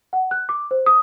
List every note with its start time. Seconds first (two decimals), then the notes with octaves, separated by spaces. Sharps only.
0.13 F#5
0.31 F#6
0.49 D6
0.71 C5
0.86 D#6